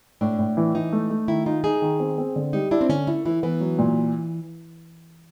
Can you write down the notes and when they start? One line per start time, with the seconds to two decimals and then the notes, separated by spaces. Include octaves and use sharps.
0.21 A2 D4
0.39 A2
0.57 E3
0.74 E3 D#4
0.92 A3
1.10 A3
1.28 D#3 E4
1.46 D#4 F4
1.64 D#4 G#4
1.82 D#3
2.00 C4
2.18 C4
2.36 D3
2.53 G3 D#4
2.71 D4 E4
2.81 C4
2.89 D3 C#4
3.07 A3 E4
3.25 E3 E4
3.43 E3 B3
3.61 F#3
3.79 A#2